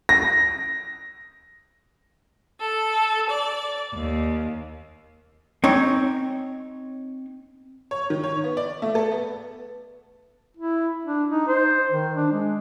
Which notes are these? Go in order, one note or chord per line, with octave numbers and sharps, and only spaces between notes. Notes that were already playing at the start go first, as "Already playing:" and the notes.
A#6
A4
D5
D#2
C4 D#4 C#5
C#5
D#3
C#5
B3
D5
A3
A4
B3
E4
D4
D#4
C5
D#3
D4
G#3